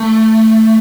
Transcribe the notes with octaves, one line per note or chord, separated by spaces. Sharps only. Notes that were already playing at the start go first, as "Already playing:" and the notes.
Already playing: A3